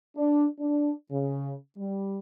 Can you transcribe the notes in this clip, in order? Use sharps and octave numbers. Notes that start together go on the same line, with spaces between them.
D4
D4
C#3
G3